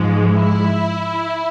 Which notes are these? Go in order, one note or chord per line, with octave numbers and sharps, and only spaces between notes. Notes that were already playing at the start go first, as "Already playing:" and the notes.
Already playing: G#2 F3 G#3
E4